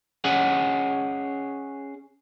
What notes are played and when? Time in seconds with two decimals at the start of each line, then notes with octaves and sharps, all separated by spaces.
0.24 C#4 G#4 D#5 F#5